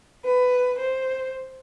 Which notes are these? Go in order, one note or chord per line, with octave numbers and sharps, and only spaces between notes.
B4
C5